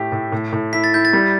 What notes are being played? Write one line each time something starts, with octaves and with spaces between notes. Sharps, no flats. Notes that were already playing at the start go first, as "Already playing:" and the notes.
Already playing: A2 A3 G4 B6
A2
A2
A2
E4 B6
A6
E4 G6
A6
G3